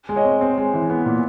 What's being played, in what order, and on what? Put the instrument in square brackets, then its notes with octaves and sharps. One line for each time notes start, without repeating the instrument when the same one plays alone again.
[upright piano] G#3
[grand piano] C#5 D#5
[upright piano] C4
C4
G#3
E3
B3
A#2